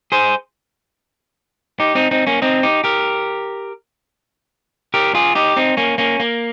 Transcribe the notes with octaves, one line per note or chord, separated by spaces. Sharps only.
G#4 C5
D#4 G4
C4 D#4
C4 D#4
A#3 C#4
C4 D#4
D#4 G4
G4 A#4
G4 A#4
F4 G#4
D#4 G4
C4 D#4
A#3 C#4
A#3 C#4
A#3